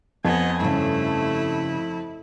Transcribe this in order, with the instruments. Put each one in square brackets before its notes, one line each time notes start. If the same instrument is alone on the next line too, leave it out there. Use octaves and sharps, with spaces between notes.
[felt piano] F2 [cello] B3 [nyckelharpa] D#5 G#5
[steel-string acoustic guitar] G2 C#3 [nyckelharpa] A3 [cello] E4